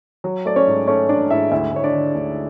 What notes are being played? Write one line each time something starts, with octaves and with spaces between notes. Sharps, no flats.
F#3
A3 D5
C#4 C#5
G#2
A3 C#4 C#5
A3 D4 D5
G#2 E4 E5
D2 E4 E5
D2 C#5
D4 D5
D3
D2